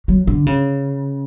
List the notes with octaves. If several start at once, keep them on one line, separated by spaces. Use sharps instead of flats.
F#3
D3
C#3